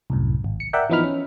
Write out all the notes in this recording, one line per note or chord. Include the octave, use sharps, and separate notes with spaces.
C2 F#2 A2
G#1
C#7
A#4 D5 E5 F#5 G5
E3 F3 B3 D#4 B5 F6
C#4